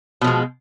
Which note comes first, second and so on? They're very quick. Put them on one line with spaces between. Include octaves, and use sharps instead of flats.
B2 F3 G#3